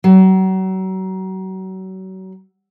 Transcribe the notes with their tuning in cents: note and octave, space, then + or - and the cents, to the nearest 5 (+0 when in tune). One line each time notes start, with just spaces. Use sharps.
F#3 +35